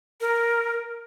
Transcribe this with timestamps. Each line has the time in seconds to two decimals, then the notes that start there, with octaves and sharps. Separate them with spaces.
0.21 A#4